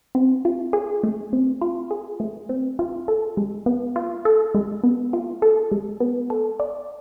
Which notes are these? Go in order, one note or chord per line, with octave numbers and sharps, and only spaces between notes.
C4
F4
G#4
A3
C4
F4
G#4
A3
C4
F4
A4
G#3
B3
F4
A4
G#3
B3
F4
A4
G#3
B3
A4
D5